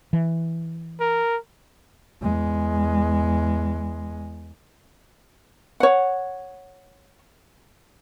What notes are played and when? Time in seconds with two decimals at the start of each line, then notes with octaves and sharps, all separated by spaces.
0.13 E3
1.00 A#4
2.23 E2 G#3
5.80 C#5 F#5